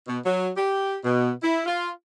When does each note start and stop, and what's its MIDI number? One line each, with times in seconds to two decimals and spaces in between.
0.07 0.19 47
0.25 0.49 54
0.57 0.96 67
1.04 1.31 47
1.43 1.62 64
1.66 1.89 65